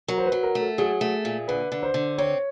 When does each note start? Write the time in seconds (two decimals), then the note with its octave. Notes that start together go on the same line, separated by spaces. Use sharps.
0.08 F#3 A#4
0.18 C5
0.26 B4
0.32 F#3
0.43 A#4
0.55 A3
0.61 A4
0.78 F#3 G#4
1.01 A3
1.25 A#2
1.48 D3 B4
1.72 D3
1.83 C5
1.94 D3
2.18 C4 C#5